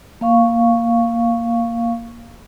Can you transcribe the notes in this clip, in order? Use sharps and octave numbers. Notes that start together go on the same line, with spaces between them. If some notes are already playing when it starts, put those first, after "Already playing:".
A#3 F5 C#6